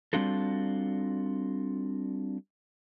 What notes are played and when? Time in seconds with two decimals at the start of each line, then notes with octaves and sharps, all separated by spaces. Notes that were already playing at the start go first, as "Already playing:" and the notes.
0.13 G3 C4 D4 F4 F#4 A4